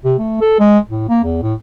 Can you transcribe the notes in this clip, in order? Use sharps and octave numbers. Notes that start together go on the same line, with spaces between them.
C3
A3
A4
G#3
A2
A#3
E2
A2